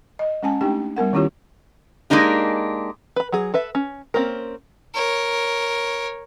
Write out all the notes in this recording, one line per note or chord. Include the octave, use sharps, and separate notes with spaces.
D#5
G#3 C#4 G#5 A5
A3 D4 D#4 G4 G5
G3 B3 A#4 F#5
D#3 C#4 E4 F4 G4 C#5
G#3 A#3 D4 D#4 G4
B4 B5
F#3 G#4
A4 B4 E5
C#4
A#3 C4 C#4 A#4
A#4 C#5